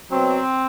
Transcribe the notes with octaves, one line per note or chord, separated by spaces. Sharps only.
B2 F#3 C4